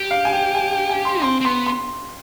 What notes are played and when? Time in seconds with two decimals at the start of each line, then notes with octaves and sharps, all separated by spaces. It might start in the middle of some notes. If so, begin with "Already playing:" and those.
Already playing: G4
0.11 F5
0.25 G#5
0.33 G5
0.55 G#5
0.72 G5
0.89 G#5
1.05 C6
1.22 C4 C6
1.41 C4
1.45 B3 C6
1.66 C6